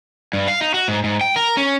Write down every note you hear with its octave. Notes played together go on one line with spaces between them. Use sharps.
G2
F5
D#4
F#4
G#2
G#2
G5
A#4
C#4